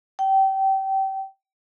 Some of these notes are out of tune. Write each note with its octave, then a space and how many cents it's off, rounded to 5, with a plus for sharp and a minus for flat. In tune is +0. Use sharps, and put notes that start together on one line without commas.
G5 -25